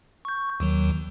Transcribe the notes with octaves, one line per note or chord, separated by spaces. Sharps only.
C#6 G6
D#2 D#3 F#3